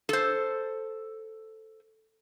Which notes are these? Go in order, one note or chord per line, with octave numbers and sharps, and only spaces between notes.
A4 C5